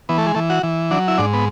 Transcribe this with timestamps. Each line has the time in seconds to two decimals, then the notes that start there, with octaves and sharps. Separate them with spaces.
0.09 E3 B3
0.18 A3
0.26 G#3
0.35 E3 A3
0.50 F#4
0.63 E3
0.91 F#3 D4
1.08 E4
1.18 G#2 D4
1.33 B3